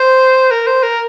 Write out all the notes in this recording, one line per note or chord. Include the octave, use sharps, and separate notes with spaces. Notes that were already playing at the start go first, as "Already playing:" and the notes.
Already playing: C5
A#4
C5
A#4